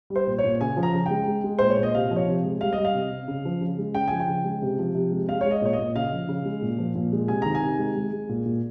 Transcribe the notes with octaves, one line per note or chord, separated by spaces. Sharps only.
G3
C5
A#2
C#5
A#2
C#3 G#5
F3
A#5
C#3
G#3 G5
G#3
G#3
A#2 C5
C#5
A#2
D#5
C3 F5
F3
C#5
C3
G#3
G3 F5
D#5
G3
F5
C3
C3
C#3
F3
C#3
G#3
C#3 G5
F3 G#5
G5
C#3
G#3
C3
F3
C3
G#3
G#3 F5
G#3 C#5
D#5
A#2 C#5
D#5
A#2
C#3 F5
F3
C#3
G#3
A#2
F3
A#2
G#3
C3 G#5
D#3 A#5
G#5
C3
G#3
G#3
G#3
A#2
A#2